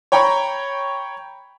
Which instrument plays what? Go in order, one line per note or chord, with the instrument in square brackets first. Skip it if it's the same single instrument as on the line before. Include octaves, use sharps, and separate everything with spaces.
[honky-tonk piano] C#5 G5 A#5 B5 C#6